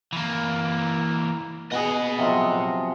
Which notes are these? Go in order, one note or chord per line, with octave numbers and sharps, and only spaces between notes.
E3 A#3
B2 G#4 D#5 F#5
C3 F3 F#3